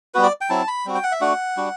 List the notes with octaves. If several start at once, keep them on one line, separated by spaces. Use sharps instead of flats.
G3 B3 F#4 B4
D5
G5
F#3 C4 E4 A5
B5
G3 C4 F#4
G5
F#5
E5
A3 D4 F#4 F#5
G3 D4 F#4